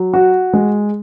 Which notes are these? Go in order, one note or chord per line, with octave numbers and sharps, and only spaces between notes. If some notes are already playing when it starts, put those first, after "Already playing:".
Already playing: F#3
F#4
G#3